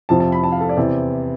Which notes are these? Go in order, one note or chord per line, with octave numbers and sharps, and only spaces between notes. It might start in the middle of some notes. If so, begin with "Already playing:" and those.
F2 C3 F3 A5
A5
B5
A5
F5
A4
D5
E2 C3 E3